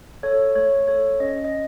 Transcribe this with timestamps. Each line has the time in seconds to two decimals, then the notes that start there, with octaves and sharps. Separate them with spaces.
0.23 A4 C#5
0.55 A3 C#5
0.88 A4 C#5
1.20 C#4 D#5
1.45 D#5
1.52 C#4